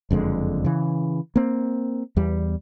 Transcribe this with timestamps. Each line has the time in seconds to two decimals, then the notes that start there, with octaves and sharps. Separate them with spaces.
0.11 F#1 F2 D3 G#3
0.65 C#3 E3
1.36 A#3 C4
2.17 E2 G3